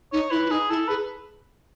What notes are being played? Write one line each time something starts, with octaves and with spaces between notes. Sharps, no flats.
D#4 C#5
E4 B4
E4
D#4 G#4
E4 A4
G#4 B4